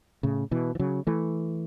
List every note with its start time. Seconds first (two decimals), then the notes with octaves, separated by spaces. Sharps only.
0.23 A2 C#3
0.51 B2 E3
0.75 E3
0.79 C#3 F#3
1.07 E3 A3